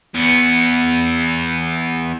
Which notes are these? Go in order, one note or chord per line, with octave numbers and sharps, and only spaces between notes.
E2 B3